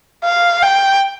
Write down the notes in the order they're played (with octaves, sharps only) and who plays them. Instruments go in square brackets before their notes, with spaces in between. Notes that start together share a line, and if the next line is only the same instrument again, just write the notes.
[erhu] F5
G5